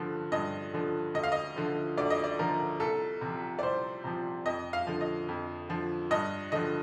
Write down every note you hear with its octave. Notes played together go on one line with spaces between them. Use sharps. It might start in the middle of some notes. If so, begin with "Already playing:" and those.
Already playing: G2 D3 F3
G2 D#5
D3 F3
D2 D#5
F5
D#5
D3 F3
D2 D5
D#5
D5
D3 F3 A#4
C2 A4
C3 F3
D5
C2 C5
C3 F3
F2 D#5
F5
D3 F3
D#5
F2
D3 F3
G2 D#5
D3 F3 D#5